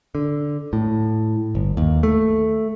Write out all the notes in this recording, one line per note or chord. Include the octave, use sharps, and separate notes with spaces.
D3
A2
G1
D#2
A3